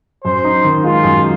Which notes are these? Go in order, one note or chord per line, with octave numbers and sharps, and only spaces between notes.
F#2 C5
D#4
D#3
G#3 F4
F#2